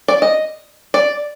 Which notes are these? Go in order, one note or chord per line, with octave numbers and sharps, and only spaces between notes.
D5
D#5
D5